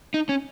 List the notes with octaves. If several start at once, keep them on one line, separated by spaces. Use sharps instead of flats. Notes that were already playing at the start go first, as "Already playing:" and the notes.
D#4
C#4